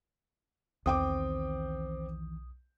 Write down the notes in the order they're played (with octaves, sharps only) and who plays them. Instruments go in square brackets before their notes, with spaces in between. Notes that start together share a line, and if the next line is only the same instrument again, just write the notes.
[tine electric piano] B1 D#6 [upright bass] E2 D#3 [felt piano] C4 G5 D6